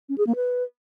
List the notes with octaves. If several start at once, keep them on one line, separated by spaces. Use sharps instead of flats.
C#4
G#4
A#3
B4